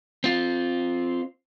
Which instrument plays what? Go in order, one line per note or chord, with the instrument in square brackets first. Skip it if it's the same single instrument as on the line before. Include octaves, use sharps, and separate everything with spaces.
[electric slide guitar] C4 F4